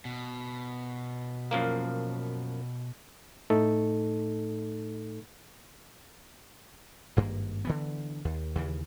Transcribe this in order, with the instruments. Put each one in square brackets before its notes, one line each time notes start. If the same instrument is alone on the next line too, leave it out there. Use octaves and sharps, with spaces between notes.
[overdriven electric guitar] B2
[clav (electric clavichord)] F#2 F3 A#3
[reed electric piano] A2 A3 D#4 A4
[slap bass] G#1 G2 A#3
D3 E3 B3
D#2
D#2 C#3 E3